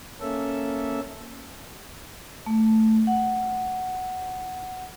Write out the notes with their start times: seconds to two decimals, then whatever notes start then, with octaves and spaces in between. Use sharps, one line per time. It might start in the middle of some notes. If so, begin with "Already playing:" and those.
0.21 A#3 C#4 A4 E5
2.46 A3
3.07 F#5